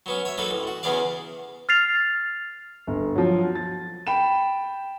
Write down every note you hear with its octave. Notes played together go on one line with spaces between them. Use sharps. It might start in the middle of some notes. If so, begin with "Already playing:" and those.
F#3 B3 C#4
C#5 E5
F#3 A#3 D#4 A4 B4
A1
F#4
E2 C#3 B3 G#4 D5 F5
F6 A6 C7 F7
G1
F3 F#3
A6
G5 B5 E7